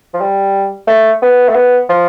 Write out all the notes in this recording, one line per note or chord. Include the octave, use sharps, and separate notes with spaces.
F3
G3
A3
B3
A3
B3
F3